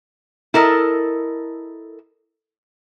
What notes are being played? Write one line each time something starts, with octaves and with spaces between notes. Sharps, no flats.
E4 A4 A#4 D#5